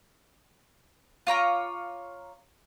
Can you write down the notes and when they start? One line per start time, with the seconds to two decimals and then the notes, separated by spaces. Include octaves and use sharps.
1.27 F4 C#5 A#5 D6